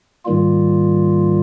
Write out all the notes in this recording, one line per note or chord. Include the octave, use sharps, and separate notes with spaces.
G#2 D#3 G3 A#3 F4